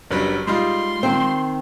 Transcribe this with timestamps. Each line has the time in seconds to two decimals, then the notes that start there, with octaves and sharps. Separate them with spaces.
0.11 F#1 F#3 G3 D4 A#4 B4
0.47 G3 G#3 D#4 F4 C6
1.03 D#3 C4